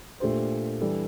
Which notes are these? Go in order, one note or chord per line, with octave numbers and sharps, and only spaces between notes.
A#2 A3 D4 G4 C5
E3 G3 D4 A4